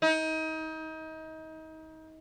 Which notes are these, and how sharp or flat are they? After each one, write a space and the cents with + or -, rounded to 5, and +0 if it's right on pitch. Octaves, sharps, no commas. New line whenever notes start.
D#4 +30